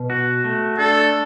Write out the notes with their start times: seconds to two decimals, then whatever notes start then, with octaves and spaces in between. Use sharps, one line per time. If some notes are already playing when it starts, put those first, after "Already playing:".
Already playing: B2
0.10 F#4
0.44 A3
0.78 D4 A4